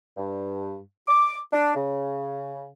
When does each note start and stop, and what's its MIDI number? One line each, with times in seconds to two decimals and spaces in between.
0.17 0.79 43
1.08 1.39 86
1.53 1.74 62
1.75 2.66 49